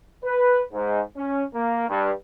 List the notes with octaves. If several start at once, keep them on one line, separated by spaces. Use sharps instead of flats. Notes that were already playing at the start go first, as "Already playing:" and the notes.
B4
G#2
C#4
A#3
G2